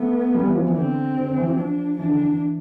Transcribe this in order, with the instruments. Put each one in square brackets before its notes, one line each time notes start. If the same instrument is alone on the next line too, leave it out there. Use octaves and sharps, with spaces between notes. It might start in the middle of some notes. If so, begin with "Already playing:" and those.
Already playing: [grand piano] A3 [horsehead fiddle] B3
[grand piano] G3
E3
F3
E3
[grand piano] D3 [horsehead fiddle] C4
[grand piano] D3
D3
E3
F3
[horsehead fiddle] D4
[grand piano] E3 [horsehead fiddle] D4
[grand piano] D3
E3
E3